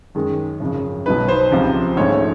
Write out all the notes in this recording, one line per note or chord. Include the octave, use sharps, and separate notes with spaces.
F#2 D#3 G#3
G#1 F#2 C#3 F3
B1 B2 F#3 B3 D#4 B4
C5
C#2 C3 F3
A#1 G#2 F3 A3 C#4 C#5